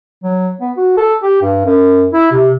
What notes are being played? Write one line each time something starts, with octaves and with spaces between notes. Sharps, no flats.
F#3
B3
F#4
A4
G4
G2
F#2
E4
C3